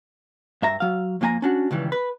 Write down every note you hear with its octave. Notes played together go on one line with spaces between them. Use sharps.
G2 E5 A#5
F#3 F5
F2 F3 A#3 G#5 A#5
C#4 D4 F#4
C#2 D#3 E3 G3
B4